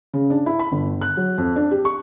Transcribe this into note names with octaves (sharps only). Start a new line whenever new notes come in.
C#3
D4
E4
B5
G1
F#6
F#3
F2
D4
G4
C#6